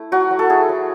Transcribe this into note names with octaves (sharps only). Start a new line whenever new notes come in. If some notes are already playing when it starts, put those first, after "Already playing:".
Already playing: A3 E4
F#3 F#4
F#3
A4
E4 G#4
F#3